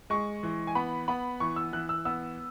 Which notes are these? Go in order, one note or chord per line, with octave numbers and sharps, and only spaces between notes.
G#3 C#6
E3
G#5
B3 B5
B3 B5
E3 C#6
E6
E3 F#6
E6
B3 E6